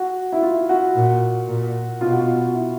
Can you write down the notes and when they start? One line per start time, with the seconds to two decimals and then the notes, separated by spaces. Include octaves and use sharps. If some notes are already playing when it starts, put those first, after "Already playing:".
Already playing: F#4
0.32 E4
0.42 F4
0.69 F#4
0.95 A#2
1.48 A#2
2.01 B2 F4
2.12 F#4
2.23 F4
2.54 E4